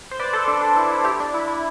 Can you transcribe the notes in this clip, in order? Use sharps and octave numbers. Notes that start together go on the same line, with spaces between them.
C5
B4 D5
A4 C5
D4
D4
E4
E4
E4 G4
D4
E4
E4